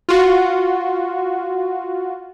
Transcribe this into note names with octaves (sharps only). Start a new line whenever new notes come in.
F4 F#4